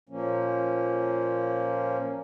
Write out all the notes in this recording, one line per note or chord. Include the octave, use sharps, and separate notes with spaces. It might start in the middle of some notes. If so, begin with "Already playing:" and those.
A#2 F3 A#3 C#4